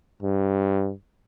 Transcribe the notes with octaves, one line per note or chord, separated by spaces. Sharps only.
G2